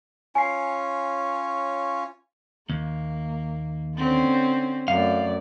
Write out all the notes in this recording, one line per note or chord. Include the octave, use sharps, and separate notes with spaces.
C#4 F4 C#5 G#5 C7
D#2 A#3
D3 C4 C#4
F#2 A3 D5 F5